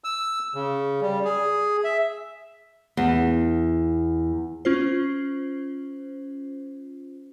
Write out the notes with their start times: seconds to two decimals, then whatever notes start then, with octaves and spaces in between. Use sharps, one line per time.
0.04 E6
0.55 C#3
1.01 G3
1.25 G#4
1.84 E5
2.97 E2
4.65 C#4 F4 C5